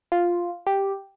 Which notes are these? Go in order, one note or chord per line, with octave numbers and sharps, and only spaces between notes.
F4
G4